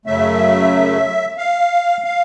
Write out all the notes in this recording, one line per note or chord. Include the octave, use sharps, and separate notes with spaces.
F#2 C#3 F#3 A3 E5
F5
F5